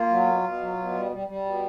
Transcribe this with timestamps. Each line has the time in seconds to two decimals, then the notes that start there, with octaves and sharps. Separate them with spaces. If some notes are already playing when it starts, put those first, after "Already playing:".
Already playing: A#3 F4
0.09 F#3
0.26 B2
0.43 B2
0.60 F#3
0.77 B2
0.94 G3
1.11 G3
1.27 G3
1.45 B2